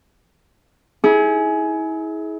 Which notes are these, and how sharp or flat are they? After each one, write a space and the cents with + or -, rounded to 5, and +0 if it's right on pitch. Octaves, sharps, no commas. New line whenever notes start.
E4 -35 G#4 +20